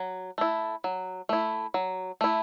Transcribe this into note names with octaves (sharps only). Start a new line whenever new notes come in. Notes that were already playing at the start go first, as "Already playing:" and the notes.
Already playing: F#3
A3 E4
F#3
A3 E4
F#3
A3 E4